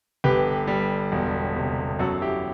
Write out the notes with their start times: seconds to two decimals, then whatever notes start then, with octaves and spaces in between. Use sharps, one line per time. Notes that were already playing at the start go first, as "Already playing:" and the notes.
0.24 G1 G4 B4
0.67 G3
1.12 E1
1.56 C3
1.99 F#2 F#4 A4
2.22 E4 G4